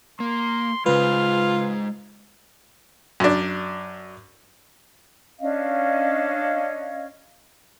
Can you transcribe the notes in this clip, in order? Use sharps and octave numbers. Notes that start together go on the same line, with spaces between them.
A#3 C6
C#3 G#3 F4 B4 C5 F6
F#2 D4
C#4 D4 D#5 F5